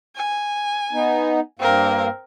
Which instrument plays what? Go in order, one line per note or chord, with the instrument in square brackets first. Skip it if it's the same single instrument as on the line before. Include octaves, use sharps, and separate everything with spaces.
[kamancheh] G#5
[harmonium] B3 D#4
[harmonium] G2 A#3 [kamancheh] C4 A#4